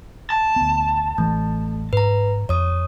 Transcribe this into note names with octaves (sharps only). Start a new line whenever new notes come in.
A5
D2 B3
A1 E3 A3
G#2 B4 A#5
F2 C#5 D#6